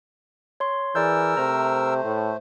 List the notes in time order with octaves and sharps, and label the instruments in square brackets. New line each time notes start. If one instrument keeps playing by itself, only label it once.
[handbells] C#5 C6
[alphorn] E3 [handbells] G#4 D5 G6 [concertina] A#4 E6
[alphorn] C3 [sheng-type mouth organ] A3 C5 [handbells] A#5
[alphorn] A2